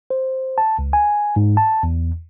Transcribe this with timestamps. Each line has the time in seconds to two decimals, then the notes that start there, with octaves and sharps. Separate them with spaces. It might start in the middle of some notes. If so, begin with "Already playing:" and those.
0.10 C5
0.58 A5
0.79 C#2
0.93 G#5
1.36 G#2
1.57 A5
1.83 E2